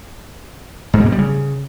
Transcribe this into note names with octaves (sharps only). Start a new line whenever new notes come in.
G#2
B2
A#3
G3
C#3